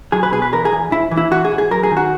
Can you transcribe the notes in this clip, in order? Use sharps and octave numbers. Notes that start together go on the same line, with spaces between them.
F#3 G#4
B4
B2 G#4
B4
E2 A#4
G#4
E2
G#2 E4
E3
E4
E3 F#4
G#4
G#2
G#4
F#3 A#4
G#4
D#3
F#4